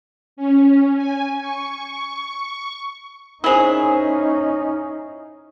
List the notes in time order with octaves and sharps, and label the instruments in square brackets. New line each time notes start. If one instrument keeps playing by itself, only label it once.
[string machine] C#4
G#5
C#6
[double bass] C#4 D#4 [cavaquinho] E4 G#4 [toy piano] A#4 C5